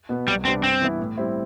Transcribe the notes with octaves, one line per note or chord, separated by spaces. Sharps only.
B2 B3
C2 G3
C3 G3 B3 C4 D4
G2 C4
E3 B3 E4
A2
G3 C4 E4